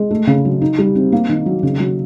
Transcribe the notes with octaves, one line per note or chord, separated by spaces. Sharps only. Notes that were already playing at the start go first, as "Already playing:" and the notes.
Already playing: G#3
A3
C#3
F#3
D#4
G3
C4
A#3
D#3
F#3
C#3
F#3